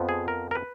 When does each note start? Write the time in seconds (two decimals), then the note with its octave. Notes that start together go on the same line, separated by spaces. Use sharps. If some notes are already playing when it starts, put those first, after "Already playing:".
Already playing: F2 F3 B3
0.09 G#4
0.28 A#4
0.51 A#4
0.55 B4